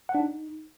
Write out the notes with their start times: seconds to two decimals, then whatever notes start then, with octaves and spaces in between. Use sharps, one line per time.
0.09 F#5
0.15 D4
0.20 D#4